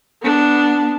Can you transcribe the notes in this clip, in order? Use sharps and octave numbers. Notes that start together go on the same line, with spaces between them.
B3 D4